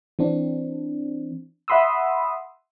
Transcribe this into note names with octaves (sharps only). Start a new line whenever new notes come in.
E3 C4 D4
E5 F#5 B5 C6 D#6 E6